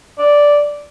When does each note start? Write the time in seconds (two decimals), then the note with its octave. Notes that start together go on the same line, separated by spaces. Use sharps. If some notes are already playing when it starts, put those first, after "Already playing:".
0.19 D5